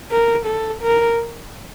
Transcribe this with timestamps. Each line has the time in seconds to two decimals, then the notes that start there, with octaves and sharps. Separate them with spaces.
0.11 A#4
0.46 A4
0.82 A#4